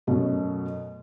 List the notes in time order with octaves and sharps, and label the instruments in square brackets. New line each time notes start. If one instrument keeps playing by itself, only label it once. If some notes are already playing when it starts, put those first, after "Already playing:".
[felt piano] F#2 B2 A3